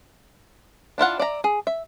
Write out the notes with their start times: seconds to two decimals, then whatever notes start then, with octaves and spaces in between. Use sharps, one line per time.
0.98 D4 E4 F4 F#5
1.19 D5 E5 A#5
1.44 G#4
1.67 E5